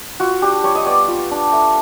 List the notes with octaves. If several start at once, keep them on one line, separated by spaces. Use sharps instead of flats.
F4 F#4
D4 G4
G3 C#5
D#5
B3 D5
F4
D4
A3